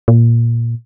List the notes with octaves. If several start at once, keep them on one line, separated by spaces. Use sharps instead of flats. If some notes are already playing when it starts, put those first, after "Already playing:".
A#2